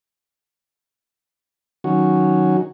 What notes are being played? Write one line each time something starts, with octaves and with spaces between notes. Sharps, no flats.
D#3 F#3 C#4 F#4